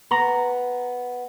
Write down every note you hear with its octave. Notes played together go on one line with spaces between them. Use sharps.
B3 A#5